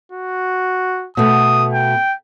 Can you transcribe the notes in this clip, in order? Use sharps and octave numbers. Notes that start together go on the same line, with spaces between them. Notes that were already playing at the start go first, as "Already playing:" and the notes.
F#4
B2 A3 D#6
G5